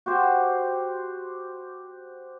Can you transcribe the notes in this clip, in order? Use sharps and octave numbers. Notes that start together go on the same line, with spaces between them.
F#4 G4 C5